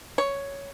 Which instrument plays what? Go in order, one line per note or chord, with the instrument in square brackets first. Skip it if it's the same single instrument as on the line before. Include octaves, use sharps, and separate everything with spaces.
[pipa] C#5